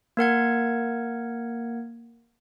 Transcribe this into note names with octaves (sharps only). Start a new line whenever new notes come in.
A#3 A#4 F#5 G#6